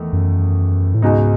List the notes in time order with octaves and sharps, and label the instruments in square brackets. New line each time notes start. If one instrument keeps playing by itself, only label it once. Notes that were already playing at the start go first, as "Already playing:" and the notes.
Already playing: [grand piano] E2 D#3 A3
[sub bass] F#2
A2
[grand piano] C#2 B2 G#3 D#4 [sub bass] G#2